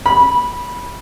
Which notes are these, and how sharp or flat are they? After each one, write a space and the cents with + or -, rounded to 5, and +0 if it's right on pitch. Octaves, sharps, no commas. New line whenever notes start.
B5 -15